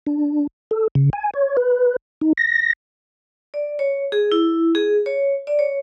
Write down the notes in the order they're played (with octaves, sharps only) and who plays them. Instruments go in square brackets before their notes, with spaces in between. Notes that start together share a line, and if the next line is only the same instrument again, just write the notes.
[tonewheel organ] D4
A4
C#3
G#5
C#5
B4
D#4
A#6
[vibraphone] D5
C#5
G#4
E4
G#4
C#5
D5
C#5